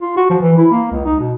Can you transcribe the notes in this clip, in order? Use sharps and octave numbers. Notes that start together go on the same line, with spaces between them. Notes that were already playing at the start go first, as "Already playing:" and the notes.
F4
F#4
F3
E3
E4
A#3
C#2
D#4
B2